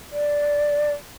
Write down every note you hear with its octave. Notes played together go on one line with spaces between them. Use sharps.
D5